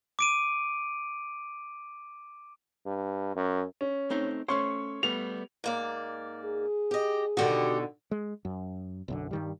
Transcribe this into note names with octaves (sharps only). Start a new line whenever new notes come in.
D6 D7 D#7
G2
F#2
C#4
A3 C4 D#4
A3 C#4 C5 C#5 C6 C#6
G3 A3 B3 F7
G#2 A#3 D5
G#4
G4 D#5
B2 D3 D#3 F#4 G4
G#3
F#2
B1 F#2 D3
G2 D#3 G3